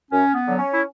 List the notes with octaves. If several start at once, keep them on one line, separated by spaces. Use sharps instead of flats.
F#2 C#4
B3
D3 F#3
C#4
E4